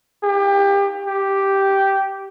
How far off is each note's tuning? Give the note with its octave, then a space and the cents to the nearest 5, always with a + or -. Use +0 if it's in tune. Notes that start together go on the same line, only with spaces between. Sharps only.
G4 +25
G4 -5